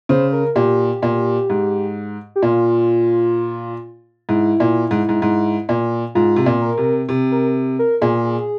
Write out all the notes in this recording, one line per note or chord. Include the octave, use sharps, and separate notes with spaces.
C#3 C5
A#4
A#2 G4
A#2
G#2
G4
A#2 F4
G#2 E4
A#2
G#2
G#2
G#2
A#2
G#2 F4
C3
A#2
A#4
C3
C3
A#4
A#4
A#2 G#4